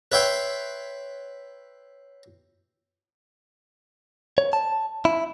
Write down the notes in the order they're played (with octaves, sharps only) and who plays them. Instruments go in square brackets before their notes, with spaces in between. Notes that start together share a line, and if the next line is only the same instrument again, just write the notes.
[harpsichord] B4 C#5 E5 G5 C6
[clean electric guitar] C#5
A5
E4